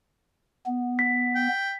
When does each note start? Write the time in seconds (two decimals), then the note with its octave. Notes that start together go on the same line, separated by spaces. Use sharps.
0.66 B3
0.99 B6
1.35 G5